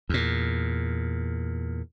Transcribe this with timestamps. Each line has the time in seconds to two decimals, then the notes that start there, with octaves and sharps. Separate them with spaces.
0.09 E2 A#2